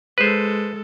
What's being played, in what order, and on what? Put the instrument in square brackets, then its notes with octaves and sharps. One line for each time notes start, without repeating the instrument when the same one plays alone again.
[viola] G#3 A4 [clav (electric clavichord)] B4 C5